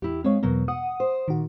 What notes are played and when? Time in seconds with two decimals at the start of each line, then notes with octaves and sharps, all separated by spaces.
0.02 E2 E4 G4
0.24 G#3 C4 C#5 F5
0.43 E2 B2 F#3 A#3 B3
0.68 F#5 D#6
1.00 C5
1.28 A#2 D#3 F#4